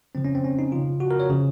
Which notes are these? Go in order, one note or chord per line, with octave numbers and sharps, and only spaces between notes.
C#3 F3 C4
C#4
C4
C#4
D#4
C#3 F3 F4
F#4
A#4
C#5
C#3 F3